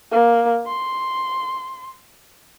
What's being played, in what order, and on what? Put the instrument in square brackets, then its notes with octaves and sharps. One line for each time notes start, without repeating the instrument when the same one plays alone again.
[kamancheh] A#3
C6